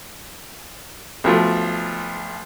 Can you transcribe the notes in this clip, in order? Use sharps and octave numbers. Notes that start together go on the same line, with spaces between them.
B1 F3 A3